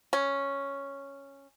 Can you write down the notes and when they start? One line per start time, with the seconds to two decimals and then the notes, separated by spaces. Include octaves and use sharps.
0.13 C#4